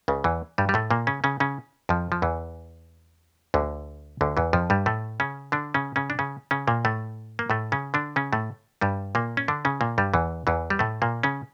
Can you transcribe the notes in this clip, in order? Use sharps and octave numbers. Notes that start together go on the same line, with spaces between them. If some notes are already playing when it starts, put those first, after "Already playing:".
C#2 C#3
E2 E3
G2 G3
G3
A2 A3
A#2 A#3
C#3 C#4
C#3 C#4
C#3 C#4
F2 F3
F3
E2 E3
D2 D3
D2 D3
E2 E3
F2 F3
G2 G3
A2 A3
C#3 C#4
D3 D4
C#3 C#4
C#3 C#4
D4
C#3 C#4
C#3 C#4
A#2 A#3
A2 A3
A#3
A2 A3
C#3 C#4
D3 D4
C#3 C#4
A2 A3
G2 G3
A#2 A#3
C#4
D3 D4
C#3 C#4
A#2 A#3
G2 G3
E2 E3
E2 E3
G3
A2 A3
A#2 A#3
C#3 C#4